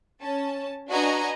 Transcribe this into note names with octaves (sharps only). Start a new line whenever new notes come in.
C#4 A5
D4 F#4 B4 D#5 G#5 A#5